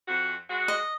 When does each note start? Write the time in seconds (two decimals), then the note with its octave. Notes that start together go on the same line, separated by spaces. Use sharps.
0.08 F2 F#4
0.50 G#3 F#4
0.68 D#5